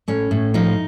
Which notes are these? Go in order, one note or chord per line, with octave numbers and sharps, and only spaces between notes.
A2 C#4
A2
F3 D#4